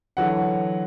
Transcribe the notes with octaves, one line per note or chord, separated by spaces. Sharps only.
D3 E3 F#3 F#5